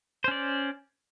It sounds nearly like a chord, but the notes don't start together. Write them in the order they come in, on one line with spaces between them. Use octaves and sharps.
C5 C#4 D5